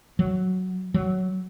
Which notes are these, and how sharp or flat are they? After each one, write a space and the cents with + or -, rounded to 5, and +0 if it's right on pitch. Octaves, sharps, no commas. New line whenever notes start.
F#3 +0
F#3 +10